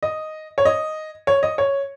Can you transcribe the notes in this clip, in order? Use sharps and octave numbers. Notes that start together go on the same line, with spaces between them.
D#5
C#5
D#5
C#5
D#5
C#5